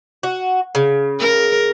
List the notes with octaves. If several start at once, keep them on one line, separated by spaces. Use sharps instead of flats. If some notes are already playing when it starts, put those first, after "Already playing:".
F#4
C#3
A#4